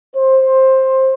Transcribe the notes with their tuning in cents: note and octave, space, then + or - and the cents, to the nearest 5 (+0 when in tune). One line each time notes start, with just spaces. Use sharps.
C5 +15